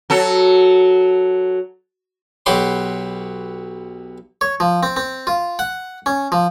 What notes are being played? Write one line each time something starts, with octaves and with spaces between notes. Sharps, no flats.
F#3 A4
B1 F#3 F#4 G4 B5 C6
C#5
F3
C4
C4
F4
F#5
C#4
F3